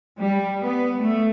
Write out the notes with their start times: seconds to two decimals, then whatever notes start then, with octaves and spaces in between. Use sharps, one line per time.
0.18 G3
0.63 B3
1.00 A3